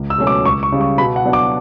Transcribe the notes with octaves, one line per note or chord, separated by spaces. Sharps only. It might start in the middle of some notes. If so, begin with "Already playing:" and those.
Already playing: C#2
E6
B2 F#3 A3 C#4
D6
C#2 C#6
C#6
C#3 G3
C#6
B2 B5
F#5
F#3 B3 D4
D6